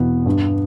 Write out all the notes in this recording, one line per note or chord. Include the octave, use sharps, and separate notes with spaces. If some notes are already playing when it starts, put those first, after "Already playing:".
Already playing: E2 B2 B3
G2